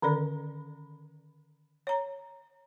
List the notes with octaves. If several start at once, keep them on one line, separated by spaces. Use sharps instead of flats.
D3 D#3 C#4 A4 D5
C#5 A#5